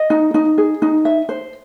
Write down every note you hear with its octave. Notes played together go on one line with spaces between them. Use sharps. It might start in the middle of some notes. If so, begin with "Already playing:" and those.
Already playing: D#5
D#4
D#4
G#4
D#4
E5
C5